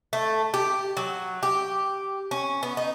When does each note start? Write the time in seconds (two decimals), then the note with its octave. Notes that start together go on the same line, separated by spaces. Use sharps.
0.13 A3
0.54 G4
0.97 F#3
1.43 G4
2.31 C#4
2.63 B3
2.77 D#4